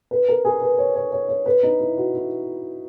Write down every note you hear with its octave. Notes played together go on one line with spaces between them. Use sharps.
B4
A#4
G#4
B4
C#5
C#5
C#5
C#5
B4
D#4
E4
F#4
E4